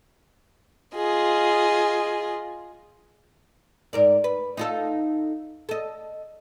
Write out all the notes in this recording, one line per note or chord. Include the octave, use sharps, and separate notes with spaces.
F4 G#4 D#5
G#2 A#4 D5
B4
D#4 F4 A4
A4 D#5